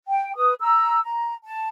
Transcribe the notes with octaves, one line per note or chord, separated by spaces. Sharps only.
G5
B4 D#6
A#5 E6
A#5
A5